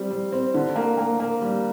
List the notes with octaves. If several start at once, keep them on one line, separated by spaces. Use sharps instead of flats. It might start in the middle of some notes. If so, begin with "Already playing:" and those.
Already playing: G3 C4
G3
C4
D3
A#3
A#3
A#3
G3